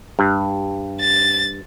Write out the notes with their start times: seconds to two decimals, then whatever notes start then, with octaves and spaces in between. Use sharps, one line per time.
0.19 G2
1.00 A6